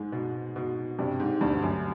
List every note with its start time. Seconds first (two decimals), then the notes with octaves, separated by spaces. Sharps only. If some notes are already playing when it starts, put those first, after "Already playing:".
Already playing: G#2 G#3
0.12 B2
0.56 B2
0.98 G2 C3
1.20 G#2
1.41 D2 G2
1.63 F#2